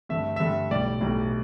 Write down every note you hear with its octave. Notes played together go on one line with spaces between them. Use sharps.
G2 D3 A3 E5
G2 D3 A3 E5
B1 A2 G3 D5
B1 A2 G3